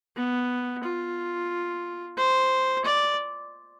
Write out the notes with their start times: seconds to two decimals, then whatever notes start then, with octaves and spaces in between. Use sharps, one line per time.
0.16 B3
0.83 F4
2.17 C5
2.85 D5